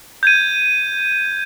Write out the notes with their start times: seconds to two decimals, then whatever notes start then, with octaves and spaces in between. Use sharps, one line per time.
0.23 G6 G#6 D#7